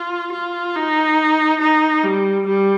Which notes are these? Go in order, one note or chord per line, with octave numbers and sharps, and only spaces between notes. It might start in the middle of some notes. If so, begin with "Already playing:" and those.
Already playing: F4
F4
D#4
D#4
G3
G3